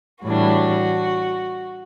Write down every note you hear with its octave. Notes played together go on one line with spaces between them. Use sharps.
A2 E3 G3 D4 F#4